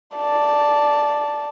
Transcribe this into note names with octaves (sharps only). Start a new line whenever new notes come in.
D5 A5